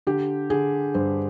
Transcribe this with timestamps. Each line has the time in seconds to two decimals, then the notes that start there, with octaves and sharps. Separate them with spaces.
0.07 D3 G4
0.50 D3 G#4
0.95 G2 C5